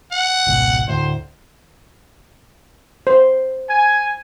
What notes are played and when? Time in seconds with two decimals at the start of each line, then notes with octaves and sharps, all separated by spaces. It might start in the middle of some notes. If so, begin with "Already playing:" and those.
0.12 F#5
0.46 G#1 C#2 B2
0.88 D2 A2 C5
3.07 C5
3.68 G#5